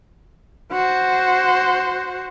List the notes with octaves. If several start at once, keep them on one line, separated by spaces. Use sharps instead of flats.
F#4 C5